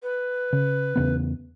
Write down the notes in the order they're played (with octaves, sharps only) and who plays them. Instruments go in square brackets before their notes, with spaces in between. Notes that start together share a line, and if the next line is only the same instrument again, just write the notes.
[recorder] B4
[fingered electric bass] C#3
E2 C#3 B3